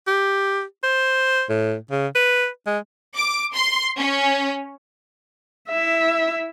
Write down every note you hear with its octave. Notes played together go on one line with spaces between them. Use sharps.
G4
C5
A2
C#3
B4
G#3
D6
C6
C#4
E4 E5